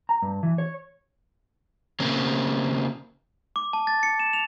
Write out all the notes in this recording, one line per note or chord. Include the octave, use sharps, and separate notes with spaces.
A#5
G2
E3
C#5
C#3 A#3 C4
D6
A5
A6
C#7
E7
F7